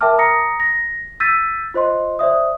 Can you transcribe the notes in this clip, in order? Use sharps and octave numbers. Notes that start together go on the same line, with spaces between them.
A#4 E5 G5 A5 D6 F6
A#5 D#6 A#6 C#7
A#6
E6 G6 A6 B6 D#7
F4 C5 D#5 C6
C5 D5 E5 D#6